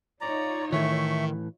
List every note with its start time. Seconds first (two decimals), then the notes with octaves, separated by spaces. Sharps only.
0.21 D#4 F4 C#5 D5 A#5
0.72 A2 D#3 E3 A3 E5 C#6